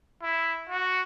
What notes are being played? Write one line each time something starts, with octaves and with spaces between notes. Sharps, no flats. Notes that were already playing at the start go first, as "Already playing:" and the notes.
E4
F#4